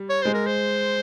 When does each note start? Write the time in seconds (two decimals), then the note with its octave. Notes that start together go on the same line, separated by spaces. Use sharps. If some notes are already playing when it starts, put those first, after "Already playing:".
Already playing: G3
0.09 C#5
0.22 G#3 C5
0.34 A#4
0.46 C5